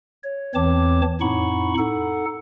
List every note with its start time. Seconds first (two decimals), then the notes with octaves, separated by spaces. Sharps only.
0.23 C#5
0.55 E2 E3 C4 C#5 A5 D6
1.21 F2 A2 D#4 F#5 B5 C#6
1.78 D#4 A4 F#5